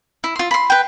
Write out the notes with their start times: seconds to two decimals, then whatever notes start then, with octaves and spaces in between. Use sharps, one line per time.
0.24 E4
0.36 F4 C6
0.51 B5 C6
0.70 B4 G5